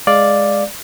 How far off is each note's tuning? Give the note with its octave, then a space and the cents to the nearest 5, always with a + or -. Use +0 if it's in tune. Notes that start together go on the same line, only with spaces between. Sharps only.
G#3 -5 D5 +0 F5 +0